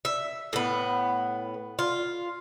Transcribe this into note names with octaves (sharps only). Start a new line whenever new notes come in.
E5
A2 B3
F4